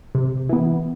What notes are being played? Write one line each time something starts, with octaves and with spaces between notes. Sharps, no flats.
C3
E3 B3